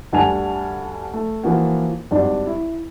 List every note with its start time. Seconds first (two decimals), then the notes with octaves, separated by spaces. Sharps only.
0.13 D2 G2 F#5 G#5 A5 F7
1.13 A3
1.43 E3 F3 A#3 F#4
2.11 G#1 G2 D4 F#4
2.47 E4